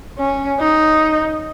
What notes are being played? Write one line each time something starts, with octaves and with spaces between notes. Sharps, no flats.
C#4
D#4